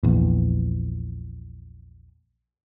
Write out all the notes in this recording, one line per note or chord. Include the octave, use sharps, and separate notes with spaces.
A#1 E2